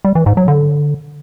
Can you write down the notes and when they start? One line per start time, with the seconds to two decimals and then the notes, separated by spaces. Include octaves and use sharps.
0.05 G3
0.15 E3
0.26 G#2
0.37 F#3
0.48 D3